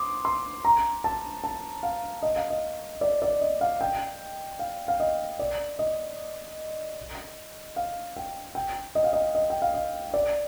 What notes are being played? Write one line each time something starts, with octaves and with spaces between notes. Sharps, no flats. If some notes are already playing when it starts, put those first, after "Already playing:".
Already playing: C6 D6 D#6
C6
A#5
A5
A5
F5
D#5
F5
D#5
D5
D5
D#5
F5
G5
F5
F5
D#5
D5
D#5
F5
G5
G5
D#5
F5
D#5
D#5
G5
F5
D#5
D5